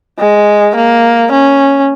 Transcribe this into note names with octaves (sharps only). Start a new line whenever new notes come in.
G#3
A#3
C#4